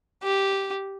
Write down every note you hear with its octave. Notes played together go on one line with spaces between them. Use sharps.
G4